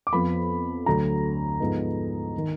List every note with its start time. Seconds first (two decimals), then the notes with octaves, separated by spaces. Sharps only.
0.07 D6
0.12 F2 F3 B3 B5
0.86 D2 D3 F#3 D4 A#5
1.60 G#2 F3 B3 D#4
2.38 D#3